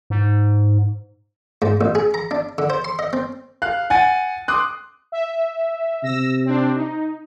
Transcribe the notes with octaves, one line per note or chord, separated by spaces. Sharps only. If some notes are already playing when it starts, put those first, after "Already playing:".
G#2
G#2
A1
G#4
A#5
D4
D3
C5
C6
D#5
C4
F5 F#6
F#5 G#5 A6 D#7
C6 D6 D#6 F#6
E5
C3 E6 A#6
C4 D4
D#4